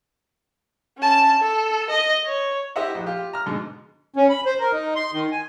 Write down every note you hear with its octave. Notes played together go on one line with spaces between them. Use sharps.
C#4 A5
A4
D#5
C#5
E4 G4 C5 D#5 E5 F#5
A#1
F4 G4
A#5 F6
G#2 B2 D3
C#4
B5
C5
A#4
D#4
C6
D#3
G#5